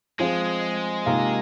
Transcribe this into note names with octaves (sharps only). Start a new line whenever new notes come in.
F3 G#3 C4 F4 G#4
C3 D#3 A#3 F4